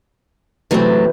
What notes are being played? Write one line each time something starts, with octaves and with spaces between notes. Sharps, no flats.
C3 E3 F#3 A3 C4